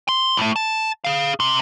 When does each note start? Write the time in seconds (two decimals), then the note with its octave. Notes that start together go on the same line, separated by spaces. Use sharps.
0.09 C6
0.37 A2 A3
0.56 A5
1.05 G#4 F5
1.40 C3 C6